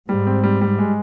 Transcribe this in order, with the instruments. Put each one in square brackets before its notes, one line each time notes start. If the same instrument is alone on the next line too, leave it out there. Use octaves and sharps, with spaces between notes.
[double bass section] G#2 [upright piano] G3
[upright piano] C4
G3
G3
G#3